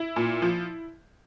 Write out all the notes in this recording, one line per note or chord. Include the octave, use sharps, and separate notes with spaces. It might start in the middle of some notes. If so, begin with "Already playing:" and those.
Already playing: E4
A#2
F3